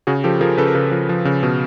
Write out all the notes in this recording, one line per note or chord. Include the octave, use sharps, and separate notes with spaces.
C#3 F#4 G#4
F3 G4 A4
F3 G#4 A#4
C#3 A4 B4
A#4
C#3 A4 B4
F3
F3
C#3
B2